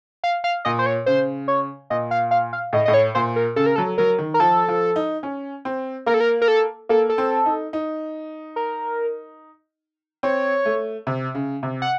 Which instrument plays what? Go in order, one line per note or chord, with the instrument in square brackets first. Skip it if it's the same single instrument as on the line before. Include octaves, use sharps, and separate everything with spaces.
[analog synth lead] F5
F5
[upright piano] A#2 [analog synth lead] D#5
[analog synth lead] C5
C#5
[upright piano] C#3 [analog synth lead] C5
[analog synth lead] C#5
[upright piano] A#2 [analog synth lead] D#5
[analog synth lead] F5
F5
F5
[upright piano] A2 [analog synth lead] D#5
[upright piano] A2 [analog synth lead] D#5
[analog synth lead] C#5
[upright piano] A#2 [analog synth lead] C5
[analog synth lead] A#4
[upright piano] C#3 [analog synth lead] A4
[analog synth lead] A#4
[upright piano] F#3 [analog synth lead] A4
[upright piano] F#3 [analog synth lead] A#4
[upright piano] D#3
[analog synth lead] A#4
[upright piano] F3 [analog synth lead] A4
[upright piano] F3
D#4
C#4
C4
[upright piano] A#3 [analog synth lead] A#4
[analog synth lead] A4
A#4
A#4
A4
[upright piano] A#3 [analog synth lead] A4
[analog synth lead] A4
[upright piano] C4
D#4
D#4
[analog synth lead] A#4
[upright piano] C4 [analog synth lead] C#5
[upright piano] A3
C3
C#3
C3
[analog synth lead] F#5